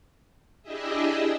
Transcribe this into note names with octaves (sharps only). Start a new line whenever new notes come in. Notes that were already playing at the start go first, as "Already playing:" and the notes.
D4 E4 G4 G#4 D#5 E5